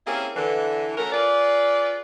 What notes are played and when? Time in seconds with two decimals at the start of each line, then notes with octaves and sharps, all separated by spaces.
0.07 A#3 C4 C#4 E4 G4 G#4
0.35 D3 E3
0.97 A3 C#4 F#4 A#4
1.13 F4 G#4 B4 D5